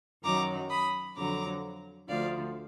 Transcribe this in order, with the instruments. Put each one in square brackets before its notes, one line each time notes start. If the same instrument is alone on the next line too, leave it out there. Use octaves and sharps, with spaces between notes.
[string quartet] F#2 D#3 F#3 A#5 D6
B5 D#6
F2 D3 F#3 A#5 D6
D2 D3 F3 D5 F5